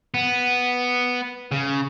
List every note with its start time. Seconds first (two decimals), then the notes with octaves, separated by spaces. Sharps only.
0.14 B3
1.52 C#3